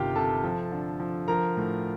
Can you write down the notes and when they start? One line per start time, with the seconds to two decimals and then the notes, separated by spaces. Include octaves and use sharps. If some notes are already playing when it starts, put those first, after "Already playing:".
Already playing: G1 C3 D#3 F4 G4 G5
0.15 C3 A4 A5
0.43 F3
0.72 D3
1.00 F3
1.28 F3 A#4 A#5
1.57 A2